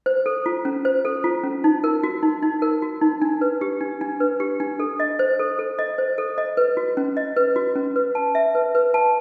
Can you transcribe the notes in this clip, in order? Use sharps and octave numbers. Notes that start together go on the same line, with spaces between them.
C5
A4
F4
C#4
C5
A4
F4
C#4
D#4
A#4
F#4
D#4
D#4
A#4
F#4
D#4
D4
B4
G4
D4
D4
B4
G4
D4
A4
D#5
C5
A4
A4
D#5
C5
A4
D#5
B4
F#4
C#4
D#5
B4
F#4
C#4
B4
A5
E5
B4
B4
A5